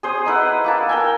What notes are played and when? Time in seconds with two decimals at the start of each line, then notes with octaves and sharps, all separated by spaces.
0.03 G#4 C5 D#6
0.25 D#4 E4 B4 F#5
0.64 A#3 E4 A5
0.89 A#4 G5 G#5